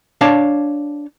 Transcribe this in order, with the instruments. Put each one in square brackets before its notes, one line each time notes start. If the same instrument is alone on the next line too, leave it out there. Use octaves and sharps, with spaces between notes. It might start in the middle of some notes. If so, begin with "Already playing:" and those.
[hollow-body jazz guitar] D4 C#5 F5 A5